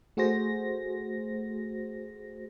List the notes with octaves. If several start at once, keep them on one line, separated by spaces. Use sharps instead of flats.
A3 F#4 G#4 C5 A#6